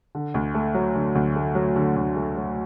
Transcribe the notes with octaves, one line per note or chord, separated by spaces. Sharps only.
D3
D2
A3
F#3
D3
D2
A3
F#3
D3
D2
A3
F#3